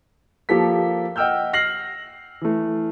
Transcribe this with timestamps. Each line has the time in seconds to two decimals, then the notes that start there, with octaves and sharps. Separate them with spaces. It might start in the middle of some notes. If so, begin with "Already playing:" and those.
0.49 F3 A#3 G4 A4 B6
1.16 D#5 F#5 G5 E6 F6 G6
1.53 F6 A#6 C7 F#7
2.41 E3 A3